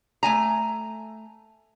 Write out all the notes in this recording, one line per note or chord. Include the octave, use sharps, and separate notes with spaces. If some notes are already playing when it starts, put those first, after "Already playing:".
A3 G#5 A#5